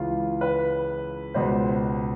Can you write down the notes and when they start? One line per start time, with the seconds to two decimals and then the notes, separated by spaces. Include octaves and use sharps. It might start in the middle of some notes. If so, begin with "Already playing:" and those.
Already playing: C#2 C#3 E3 F4
0.41 B4
1.34 C#2 B2 C5